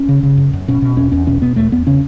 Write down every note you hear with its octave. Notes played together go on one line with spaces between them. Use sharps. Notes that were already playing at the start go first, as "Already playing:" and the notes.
Already playing: C#4
C#3
C#3
F#2
F#2
B2 C#4
B2
E2 C#4
E2 C#4
B2 C#4
B2 B3
E2 A3
E2 B3
C#3 C#4